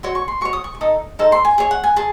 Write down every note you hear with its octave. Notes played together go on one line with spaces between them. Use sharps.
F#4 C#5 C6
C#6
C6
F#4 C#5 C#6
D#6
C#6
C#6
D#4 A4 D#6
D#4 A4 C5
C6
G#5
G#4 C#5 G#5
F#5
G#5
G#4 A5